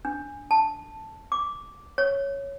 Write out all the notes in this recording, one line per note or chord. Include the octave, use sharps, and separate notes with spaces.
D4
A5
D6
C#5